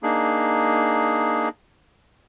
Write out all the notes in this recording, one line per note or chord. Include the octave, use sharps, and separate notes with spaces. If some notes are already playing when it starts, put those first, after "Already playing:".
A#3 D4 D#4 G#4